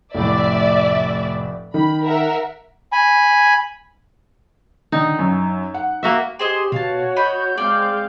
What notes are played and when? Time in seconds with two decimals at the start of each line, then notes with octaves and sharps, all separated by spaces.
0.14 F1 A2 D5 E5
1.74 D#3 B5
2.04 A#4 E5 F#5
2.92 G#5 B5
4.92 D3 D#3 D#4
5.19 F#2
5.74 F#5
6.03 A#3 F#4 E5
6.39 G4 G#4 C5 D#5
6.72 B2 F#4 C#5 F5 A5
7.16 D#5 B5 G6
7.57 G#3 C4 D5 F5 G5